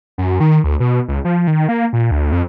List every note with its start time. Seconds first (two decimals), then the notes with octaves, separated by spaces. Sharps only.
0.18 F#2
0.40 D#3
0.64 D2
0.80 B2
1.08 C#2
1.25 F3
1.47 D#3
1.69 A#3
1.93 A#2
2.11 D2
2.32 F2